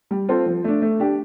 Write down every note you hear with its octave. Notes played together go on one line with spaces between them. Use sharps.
G3
C4 F4 A4 C5
F3
A3 D4
A3
D4 G4